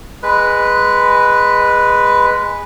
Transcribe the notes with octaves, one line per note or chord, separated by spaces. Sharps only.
G#3 B4